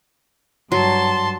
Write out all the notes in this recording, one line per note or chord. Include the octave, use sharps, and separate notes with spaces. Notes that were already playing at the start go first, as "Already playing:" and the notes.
G2 F#3 A5 C6